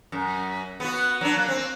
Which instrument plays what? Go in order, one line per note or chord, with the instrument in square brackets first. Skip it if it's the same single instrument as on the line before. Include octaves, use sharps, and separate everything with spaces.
[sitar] F#2
B3 F#4
F#3 D4
A#3
C4